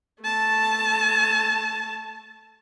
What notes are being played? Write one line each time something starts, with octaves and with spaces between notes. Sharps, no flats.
A3 A5